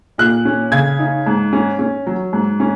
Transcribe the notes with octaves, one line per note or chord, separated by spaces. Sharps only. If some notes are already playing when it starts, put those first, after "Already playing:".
A#2 F#6
C#4
C#3 G#6
D#4
G#2
C#4
C#4
F#3
G#2
C#4